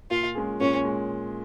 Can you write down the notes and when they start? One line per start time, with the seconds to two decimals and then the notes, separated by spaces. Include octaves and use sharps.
0.11 A#2 F4
0.35 G#3 C#4 G#4
0.60 A#2 C#4
0.85 G#3